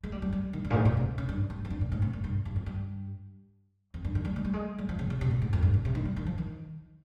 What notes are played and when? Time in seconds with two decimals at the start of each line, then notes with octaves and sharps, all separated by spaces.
0.03 G#3
0.12 G3
0.22 G3
0.33 G3
0.53 D#3
0.65 G2
0.70 A#2
0.75 G#2
0.85 A#2
0.97 C3
1.18 C#3
1.29 G2
1.50 G2
1.65 F2
1.70 G2
1.81 A#2
1.92 G#2
2.02 C3
2.13 A#2
2.24 G2
2.45 G2
2.56 F2
2.66 G2
3.94 F2
4.05 G2
4.15 D#3
4.25 G3
4.36 G#3
4.45 G3
4.53 G#3
4.78 G3
4.89 F3
4.99 C#3
5.10 C#3
5.21 C3
5.31 A#2
5.42 G#2
5.53 F2
5.62 G2
5.74 C3
5.85 C3
5.95 D#3
6.05 G3
6.16 D#3
6.26 F3
6.38 D#3